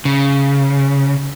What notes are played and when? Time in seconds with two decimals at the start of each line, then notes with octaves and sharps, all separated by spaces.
0.05 C#3